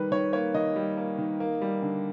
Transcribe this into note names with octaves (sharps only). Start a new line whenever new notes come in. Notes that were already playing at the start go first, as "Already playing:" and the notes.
Already playing: D#3 G3 B4
D#3 C#5
A#3 C#5
D#3 D#5
G3
A#3
D#3
A#3
G3
D3